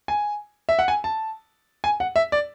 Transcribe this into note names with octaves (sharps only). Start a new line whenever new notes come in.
G#5
E5
F#5
G#5
A5
G#5
F#5
E5
D5